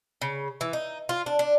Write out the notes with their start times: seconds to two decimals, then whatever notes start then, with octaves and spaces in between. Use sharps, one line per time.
0.22 C#3
0.61 E3
0.73 D#4
1.09 F4
1.26 D4
1.39 D4